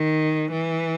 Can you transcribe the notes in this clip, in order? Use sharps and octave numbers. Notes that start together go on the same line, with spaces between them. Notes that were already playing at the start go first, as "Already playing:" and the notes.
Already playing: D#3
E3